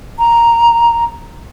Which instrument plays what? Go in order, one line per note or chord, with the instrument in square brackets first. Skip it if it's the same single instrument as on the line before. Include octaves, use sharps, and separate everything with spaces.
[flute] A#5